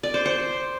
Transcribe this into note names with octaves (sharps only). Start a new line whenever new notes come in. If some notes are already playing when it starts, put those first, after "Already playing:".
D5
C5
C5